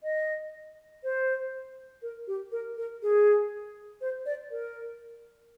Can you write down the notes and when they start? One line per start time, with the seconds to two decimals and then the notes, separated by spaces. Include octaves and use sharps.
0.03 D#5
1.04 C5
2.02 A#4
2.27 G4
2.52 A#4
2.77 A#4
3.02 G#4
4.01 C5
4.26 D5
4.51 A#4